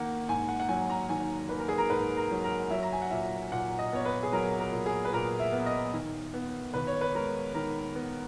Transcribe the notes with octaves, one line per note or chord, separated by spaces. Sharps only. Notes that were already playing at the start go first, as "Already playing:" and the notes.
Already playing: D#3 A#3 F#5
G#2 G#5
F#5
F#5
F#3 G#5
A#5
D#3 G#5
A#3 B4
A#4
G#4
A#4
G#2 B4
A#4
F#3
A#4
F#3 E5
A#5
G#5
F#5
A#2 E5
A#2 F#5
D#5
B3 C#5
B4
G#4
F#3 A#4
A#4
A#2
G#4
B4
A#2 A#4
E5
B3
D#5
D#3
B3
D#2 B4
C#5
B4
G#3 A#4
D#3 A#4
B3